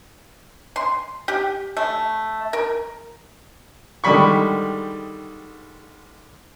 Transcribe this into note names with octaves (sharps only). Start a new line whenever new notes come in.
C6
G4
A3
A#4
G#2 D3 D#3 G3 B5 C#6